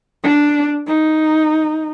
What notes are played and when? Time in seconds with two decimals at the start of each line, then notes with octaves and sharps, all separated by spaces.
0.24 D4
0.87 D#4